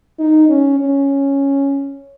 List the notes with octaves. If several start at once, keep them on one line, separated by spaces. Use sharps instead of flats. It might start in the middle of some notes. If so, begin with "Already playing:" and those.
D#4
C#4
C#4